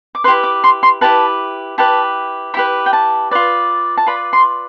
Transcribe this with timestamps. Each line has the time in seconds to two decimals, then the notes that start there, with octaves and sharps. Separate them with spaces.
0.15 D6
0.24 B4 C6
0.28 E4 G4
0.44 D6
0.64 C6
0.83 C6
1.01 E4 G4 B4 A5
1.78 E4 G4 B4 A5
2.54 E4 G4 B4 B5
2.86 G5
2.93 A5
3.31 F4 B4 D5
3.97 A5
4.06 F4 B4 D5 B5
4.33 C6